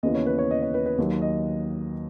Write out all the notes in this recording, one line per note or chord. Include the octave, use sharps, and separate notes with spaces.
D#2 C#3 E3 B3 D#5
C#5
B4
C#5
D#5
C#5
B4
B4
D#2 D#3 F#3
D#5